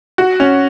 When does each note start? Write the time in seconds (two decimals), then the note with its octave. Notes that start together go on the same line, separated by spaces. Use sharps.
0.18 F#4
0.40 C#4